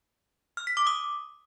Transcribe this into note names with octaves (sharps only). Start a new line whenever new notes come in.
F6
B6
D6
D#6